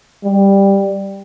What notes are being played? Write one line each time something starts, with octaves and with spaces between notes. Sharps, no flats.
G3